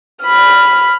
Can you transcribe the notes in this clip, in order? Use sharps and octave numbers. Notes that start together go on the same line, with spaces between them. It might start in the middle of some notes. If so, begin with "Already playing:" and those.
B5 F6